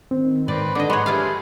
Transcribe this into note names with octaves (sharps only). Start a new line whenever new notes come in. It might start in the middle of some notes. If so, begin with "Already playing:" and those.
D#3 C4
G#2 C4 B4 D5
D3 D#3 D4 B4 D#5 D6
G#3 C#5 F#5 B5 C6
G#3 A3 E4 F4 G4 G#4 F5